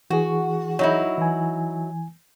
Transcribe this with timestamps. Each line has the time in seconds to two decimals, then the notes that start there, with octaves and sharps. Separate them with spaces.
0.10 E3 F#4 G#4
0.79 F#3 D#4 E4
1.18 E3 G#5